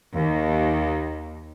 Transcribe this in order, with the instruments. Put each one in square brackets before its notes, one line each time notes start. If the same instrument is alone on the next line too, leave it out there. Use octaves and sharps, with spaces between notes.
[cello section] D#2